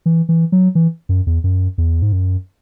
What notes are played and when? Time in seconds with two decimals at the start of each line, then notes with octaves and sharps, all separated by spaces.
0.06 E3
0.29 E3
0.52 F#3
0.75 E3
1.09 F#2
1.27 E2
1.44 F#2
1.78 E2
2.02 G#2
2.12 F#2